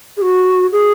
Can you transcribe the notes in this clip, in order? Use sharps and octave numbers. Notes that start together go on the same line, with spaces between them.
G#4
F#4
G#4